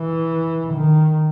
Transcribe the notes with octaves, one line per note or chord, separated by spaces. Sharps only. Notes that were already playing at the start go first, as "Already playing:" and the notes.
Already playing: E3
D#3